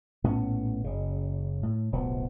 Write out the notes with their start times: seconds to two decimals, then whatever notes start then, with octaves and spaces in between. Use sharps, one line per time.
0.24 A#1 A2 B3 C#4
0.84 F#1 C#3
1.63 A2
1.92 D1 B1 F3 B3